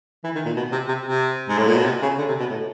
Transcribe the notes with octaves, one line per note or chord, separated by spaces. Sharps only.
E3
D#3
A#2
B2
C3
C3
C3
G#2
A2
A#2
B2
C3
C#3
D3
C3
B2
A2